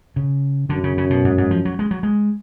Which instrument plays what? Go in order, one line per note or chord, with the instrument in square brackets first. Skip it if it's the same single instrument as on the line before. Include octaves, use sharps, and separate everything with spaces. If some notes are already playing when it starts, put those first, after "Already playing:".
[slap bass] C#3
[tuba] F#2 [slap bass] D3
[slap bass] C#3
C#3
B2
G#2
G#2
F3
F#3
G#3
F#3
G#3